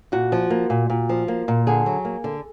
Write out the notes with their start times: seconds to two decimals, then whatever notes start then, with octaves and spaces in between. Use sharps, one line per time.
0.12 A#2 F#4
0.32 F3
0.50 A#3
0.70 A#2
0.90 A#2
1.09 F3
1.28 A#3
1.48 A#2
1.67 D3 G#4
1.86 F#3
2.05 A#3
2.24 D3